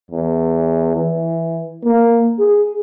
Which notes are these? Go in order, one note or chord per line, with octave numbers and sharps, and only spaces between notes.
E2
E3
A#3
G#4